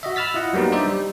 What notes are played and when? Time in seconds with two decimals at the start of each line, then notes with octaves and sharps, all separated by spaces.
0.03 F#4 D#5 E5
0.16 B5 E6 F6 A6 B6
0.34 E4 F4 D#5 F#5
0.53 F#3 G3 A#3 B3 D#4
0.72 D4 D#4 C5 D5 E5
0.87 G3